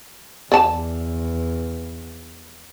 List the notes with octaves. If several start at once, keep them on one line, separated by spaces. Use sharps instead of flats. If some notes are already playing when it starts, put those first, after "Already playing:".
E2 D5 A5